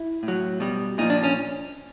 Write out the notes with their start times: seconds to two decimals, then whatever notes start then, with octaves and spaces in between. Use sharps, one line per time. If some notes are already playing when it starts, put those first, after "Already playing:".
Already playing: E4
0.23 A2
0.28 F#3
0.60 B2 G3
0.98 A#2 F3 D#4
1.10 D4
1.23 C#4